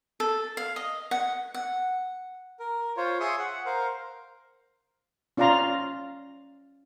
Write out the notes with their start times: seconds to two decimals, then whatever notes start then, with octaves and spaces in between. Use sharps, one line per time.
0.20 A4
0.57 F5
0.76 D#5
1.11 F#5
1.54 F#5
2.59 A#4
2.97 F4 C5 C#5
3.20 G#4 E5 C6 C#6 D#6
3.39 F#5
3.65 A#4 C5 F5
5.37 C#4 F4 D5 F5 A#5 C6